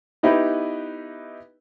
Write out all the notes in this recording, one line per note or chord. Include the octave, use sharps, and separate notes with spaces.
B3 D#4 E4 G4 B4